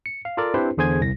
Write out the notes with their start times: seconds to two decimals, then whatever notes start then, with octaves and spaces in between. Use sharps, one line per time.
0.06 C#7
0.25 F5
0.37 F4 A4 A#4 D5
0.54 C4 D4 E4 G4 B4 C5
0.77 E2 D3 G#4 C5 G#5 G#6
1.01 C2 A#6